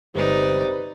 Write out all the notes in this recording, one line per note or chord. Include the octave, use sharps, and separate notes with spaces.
G1 C3 G#3 D#4 B4 D5 A#5